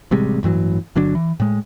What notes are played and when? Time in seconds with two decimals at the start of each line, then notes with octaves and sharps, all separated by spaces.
0.11 A1 C3 G3 G#3
0.43 A1 G2 E3 F#3
0.96 G1 D3 F#3 D4
1.15 E3
1.40 A2 G#3